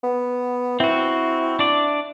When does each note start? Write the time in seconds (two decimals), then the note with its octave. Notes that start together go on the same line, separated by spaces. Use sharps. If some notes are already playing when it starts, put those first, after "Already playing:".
0.04 B3
0.80 C4 E4 F#4
1.59 D4 D5